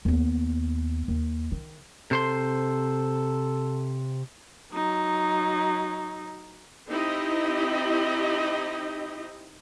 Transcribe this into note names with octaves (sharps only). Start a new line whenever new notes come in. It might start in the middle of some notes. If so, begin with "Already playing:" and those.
D#2 B3
D#2
D#3
C3 A4 C5 C6
F#3 D#4
C4 D#4 E4 G4 D#5